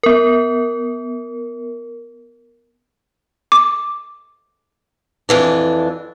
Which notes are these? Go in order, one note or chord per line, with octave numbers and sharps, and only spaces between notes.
B3 A#4
D6
F2 E3 D4